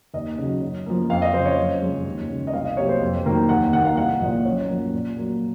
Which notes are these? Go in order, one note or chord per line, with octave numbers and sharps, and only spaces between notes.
D#2 D#5
C#3 F#3
F#2
F3 A#3
F2 F5
D#5
C#3 F3 C5
C#5
F#2
C#3 F3 G#3
D#2
C#3 G#3
D#5
C2 F5
D#5
C3 F#3 A#3 C#5
C5
F2
D#3 F#3 A#3
D#2 F#5
D#3 A#3 F#5
F5
C2 F#5
A#2 F3 A#3 D#5
F#2 C#5
F3 A#3
A#2
F#3 A#3